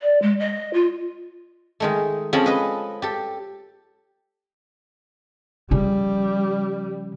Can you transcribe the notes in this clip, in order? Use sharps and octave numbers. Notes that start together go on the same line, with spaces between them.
D5
G#3
D#5
F4
D#3 G#3 A3
F3 G#3 C4 C#4 A4 B5
B4 D#5
G4 A4
C#3 F3 G3